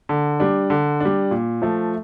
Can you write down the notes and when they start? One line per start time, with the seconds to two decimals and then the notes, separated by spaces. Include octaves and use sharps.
0.09 D3
0.40 G3 D4
0.70 D3
1.00 G3 D4
1.31 A#2
1.62 F3 A3